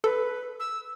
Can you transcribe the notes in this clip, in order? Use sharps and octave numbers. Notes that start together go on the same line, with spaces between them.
A4 B4
E6